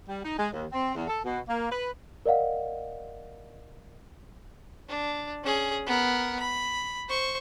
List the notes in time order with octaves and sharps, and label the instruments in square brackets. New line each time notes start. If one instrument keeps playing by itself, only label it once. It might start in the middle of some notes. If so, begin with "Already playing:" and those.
[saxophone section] G3
D#4
G#3
D#2
C4
E2
A4
B2
A#3
B4
[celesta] A#4 D5 D#5 F5 F#5
[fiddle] D4
C#4 G#4
B3 A#4
B5
C5 C#6